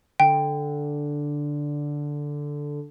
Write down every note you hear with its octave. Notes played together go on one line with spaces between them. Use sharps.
D3 G5